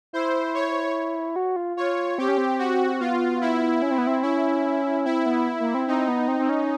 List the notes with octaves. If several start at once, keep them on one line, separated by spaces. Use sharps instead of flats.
E4 C5
C#5
F#4
F4
F4 C#5
C4 G4
C#4
C4
F#4
B3 F4
E4
C#4
C4
B3
C4
C#4 E4
C4 E4
B3
A#3
C4
C4 D#4
B3
C4
C4
C#4